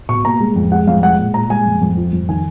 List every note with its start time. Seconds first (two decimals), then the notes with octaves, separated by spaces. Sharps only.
0.09 B2 C#6
0.25 A#3 A#5
0.40 G#3
0.56 F2
0.72 G#3 F#5
0.87 F2 F5
1.03 G#3 F#5
1.19 A#2
1.34 A#2 A#5
1.50 G#3 G#5
1.66 F2
1.81 F2
1.97 F3
2.12 F2
2.29 D#3 G#5